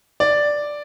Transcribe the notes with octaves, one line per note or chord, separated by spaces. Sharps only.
D5